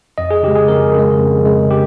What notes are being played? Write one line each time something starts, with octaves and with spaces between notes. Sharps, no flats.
F2 D#5
G#4
C#3 G#3 G4
G#4
F2 A#4
C#3 G#3
F2
C#3 G#3
G4